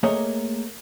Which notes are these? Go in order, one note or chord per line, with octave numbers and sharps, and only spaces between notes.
A3 A#3 G#4 A#4 C#5 D#5